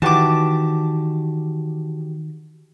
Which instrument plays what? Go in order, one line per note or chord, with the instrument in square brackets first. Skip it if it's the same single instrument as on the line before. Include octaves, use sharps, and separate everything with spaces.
[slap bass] D#3 [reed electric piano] E3 F#4 G4 [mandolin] A5 D6